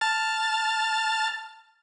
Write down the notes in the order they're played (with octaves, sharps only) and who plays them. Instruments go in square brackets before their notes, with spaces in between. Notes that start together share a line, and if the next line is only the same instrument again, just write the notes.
[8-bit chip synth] A5 F6 A6